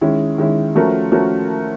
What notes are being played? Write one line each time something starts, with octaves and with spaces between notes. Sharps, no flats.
D#3 G#3 C#4 E4
D#3 G#3 C#4 E4
F3 A3 C#4 F#4 A#4
F3 A3 C#4 F#4 A#4